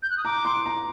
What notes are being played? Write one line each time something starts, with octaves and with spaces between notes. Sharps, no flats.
G6
F#6
D#6
A#5 D6
C6
A#5